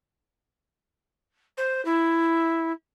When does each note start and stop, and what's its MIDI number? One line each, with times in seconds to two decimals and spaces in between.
1.57 1.83 72
1.85 2.72 64